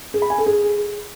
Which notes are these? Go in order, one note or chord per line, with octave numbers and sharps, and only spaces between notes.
G#4
B5
G#5
A4
G#4